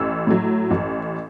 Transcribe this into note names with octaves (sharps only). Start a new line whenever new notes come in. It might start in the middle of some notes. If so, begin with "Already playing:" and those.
Already playing: A1 E6
A2 F#3
A1